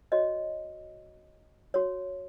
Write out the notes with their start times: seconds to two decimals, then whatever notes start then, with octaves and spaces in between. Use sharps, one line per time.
0.12 F#4 C#5 D#5
1.74 F#4 C#5